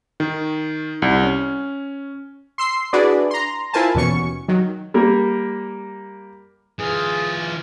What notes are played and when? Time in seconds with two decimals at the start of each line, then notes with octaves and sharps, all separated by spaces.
0.20 D#3
1.02 C2
1.23 C#4
2.58 C6 E6 C7
2.93 D4 E4 F#4 G#4 B4 D5
3.31 A#5 C6
3.73 E4 F4 A#4 C5 G#5 A5
3.95 D#2 B2 E3 C#4 C#6 C#7
4.48 D#3 F#3
4.94 G3 A#3
6.79 E3 F4 G#4